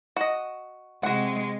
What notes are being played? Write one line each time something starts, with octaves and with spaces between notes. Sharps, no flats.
F#4 D#5
C3 G#3 F#4 F#5